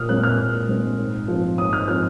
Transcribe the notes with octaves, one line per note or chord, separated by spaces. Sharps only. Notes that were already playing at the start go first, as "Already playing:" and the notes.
Already playing: A#2 D#6 F6
G#3 C4 F#6
F6
A#2
G#3 C4
G#2
F3 C4
G#2 D#6
F6
F3 C4 F6